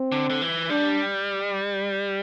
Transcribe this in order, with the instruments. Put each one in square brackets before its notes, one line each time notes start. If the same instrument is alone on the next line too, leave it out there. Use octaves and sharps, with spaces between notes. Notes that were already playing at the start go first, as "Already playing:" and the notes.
Already playing: [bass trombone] C4
[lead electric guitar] D3
D3
E3
[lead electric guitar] G3 [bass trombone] D4